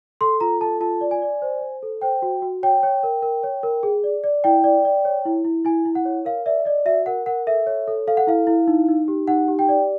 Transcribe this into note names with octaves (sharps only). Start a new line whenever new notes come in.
A4 C6
F4 A#5
A4 A5
F4 A5
D5
G#5
D5
C5
C5
A4
C5 G5
F#4
F#4
C#5 G5
C#5
A#4
A#4
C#5
A#4
G#4
D5
D5
E4 G5
D5
D5
C#5
E4
E4
E4 G#5
E4
F#5
C#5
A#4 F5
D5 E5
D5 D#5
F#4 E5
A#4 F#5
A#4 F#5
A4 E5
C#5
A4
A4 F5
F#5
E4 F5
E4
D#4
D#4
G4
D#4 F#5
G4
G5
D5